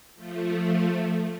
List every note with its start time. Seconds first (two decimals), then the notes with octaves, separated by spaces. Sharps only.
0.15 F3 A3